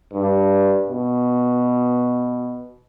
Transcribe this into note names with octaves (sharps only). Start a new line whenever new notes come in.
G2
B2